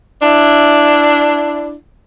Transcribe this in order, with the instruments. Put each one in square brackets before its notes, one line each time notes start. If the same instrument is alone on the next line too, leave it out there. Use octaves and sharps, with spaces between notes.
[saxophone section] D4 E4